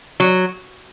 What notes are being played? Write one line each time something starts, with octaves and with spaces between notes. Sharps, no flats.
F#3